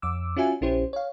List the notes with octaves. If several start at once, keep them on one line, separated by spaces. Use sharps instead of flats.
F2 D6 E6
C#4 F4 F#4 E5 G#5
A#1 C#4 E4 G4 C5
C#5 F5